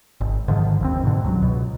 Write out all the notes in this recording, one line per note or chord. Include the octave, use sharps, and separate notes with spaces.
G#1
G#2 D3 D#3 F3
G1 D#2 C4
G#2 B2 D3
C#2 F#3
C#2 B2